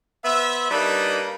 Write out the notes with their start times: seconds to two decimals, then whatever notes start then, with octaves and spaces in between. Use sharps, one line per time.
0.24 B3 C5 E5
0.71 G3 A#3 D4 D#4 B4